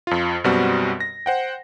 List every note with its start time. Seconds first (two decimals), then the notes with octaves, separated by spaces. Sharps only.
0.07 F2 F4
0.44 F#2 B2 G3 B3 C4 F#4
1.00 A#6
1.26 C5 F#5 G5